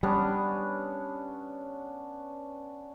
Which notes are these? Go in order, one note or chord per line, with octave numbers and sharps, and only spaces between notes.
G3 B3 C#4 D4